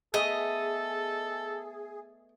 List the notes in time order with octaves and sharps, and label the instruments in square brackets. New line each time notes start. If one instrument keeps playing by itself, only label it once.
[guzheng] A3 B3 [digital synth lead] G#4 [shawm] A4 [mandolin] D#5